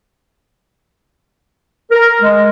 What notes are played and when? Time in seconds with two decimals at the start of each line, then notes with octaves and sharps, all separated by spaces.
1.92 A#4
2.22 G#3